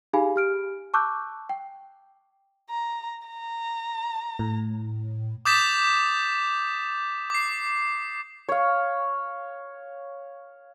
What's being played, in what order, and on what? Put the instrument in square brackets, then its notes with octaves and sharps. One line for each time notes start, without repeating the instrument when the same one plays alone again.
[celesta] D#4 G4 G#4 F5 G#5 B5
G4 F6 D7
A5 C#6 D6 E6 F#6 G6
G5
[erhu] A#5
A#5
[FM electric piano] A2
[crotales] D6 D#6 G6 A6 B6 E7
D6 C7
[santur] C#5 F5